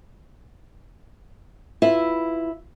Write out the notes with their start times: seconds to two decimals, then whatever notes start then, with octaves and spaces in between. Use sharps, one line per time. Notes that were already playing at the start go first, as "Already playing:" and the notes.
1.82 E4 F4 B4 E5